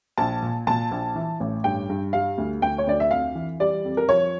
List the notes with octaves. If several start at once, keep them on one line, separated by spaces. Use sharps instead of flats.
A#1 A5
A#2
A#2 A5
A#1
E3
A1
G2 G5
G2
G3 F5
D2
D2 G5
C#5
D2 D5
E5
F2 F5
E3
G3 D5
F2
A#4
F3 C#5